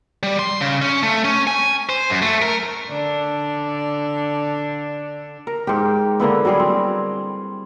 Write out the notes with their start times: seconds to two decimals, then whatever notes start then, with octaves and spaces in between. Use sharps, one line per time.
0.23 G3
0.39 C6
0.61 C#3
0.82 C#4
1.03 A3
1.25 C#4
1.47 G#5
1.89 C5
2.10 F#2
2.22 A3
2.42 A#4
2.88 D3 D4
5.47 A#4
5.67 G#2 G4
6.20 D3 A#3 B3 E4
6.45 F#3 G3 G#4
6.59 C4